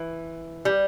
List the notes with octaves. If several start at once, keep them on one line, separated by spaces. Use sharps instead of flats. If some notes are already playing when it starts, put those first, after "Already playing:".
Already playing: E3
G3